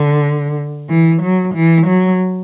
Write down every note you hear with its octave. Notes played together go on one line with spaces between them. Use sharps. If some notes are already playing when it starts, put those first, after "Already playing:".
Already playing: D3
E3
F#3
E3
F#3